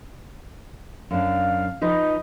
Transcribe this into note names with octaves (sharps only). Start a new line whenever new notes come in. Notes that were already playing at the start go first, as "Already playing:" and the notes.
F#2 D4 F5
F3 D#4 B4 D#5